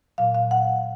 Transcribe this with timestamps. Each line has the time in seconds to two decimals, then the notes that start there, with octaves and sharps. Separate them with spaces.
0.18 A#2 F#3 F5
0.35 F5
0.51 F#5